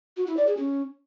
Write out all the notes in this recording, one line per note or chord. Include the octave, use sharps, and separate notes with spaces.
F#4
E4
D5
G#4
C#4